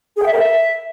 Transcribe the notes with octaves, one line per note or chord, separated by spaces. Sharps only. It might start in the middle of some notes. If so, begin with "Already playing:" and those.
G#4
G5
E5
A#4
E5